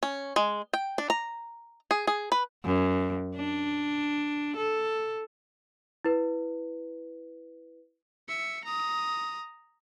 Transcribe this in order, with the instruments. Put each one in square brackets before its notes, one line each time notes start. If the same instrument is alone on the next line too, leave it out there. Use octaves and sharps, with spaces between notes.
[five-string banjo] C#4
G#3
G5
D4
A#5
G#4
G#4
B4
[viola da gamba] F#2
D4
A4
[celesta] E4 B4
[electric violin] E5 C#7
A#5 D#6